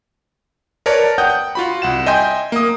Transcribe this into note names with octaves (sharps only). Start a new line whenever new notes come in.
A#4 B4 C#5 D5 A5
F#5 G5 D#6 G6
F4 F#4 B5
C2 F#5 E7
D#5 E5 G5 G#5 C6 G6
A#3 D#6